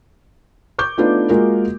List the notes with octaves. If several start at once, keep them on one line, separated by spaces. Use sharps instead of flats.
C#6 D6 G6
A3 B3 D4 D#4 F4 B4
G#3 A#3 F4 F#4 A#4